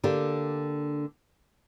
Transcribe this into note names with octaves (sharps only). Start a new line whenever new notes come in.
D3 A#3 D4 G4